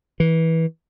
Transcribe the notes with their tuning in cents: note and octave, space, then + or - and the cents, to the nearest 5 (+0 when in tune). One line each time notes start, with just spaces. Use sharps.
E3 -20